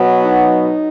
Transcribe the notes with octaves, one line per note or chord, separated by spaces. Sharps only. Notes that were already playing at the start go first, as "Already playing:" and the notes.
Already playing: B2 F#3 B3
D#4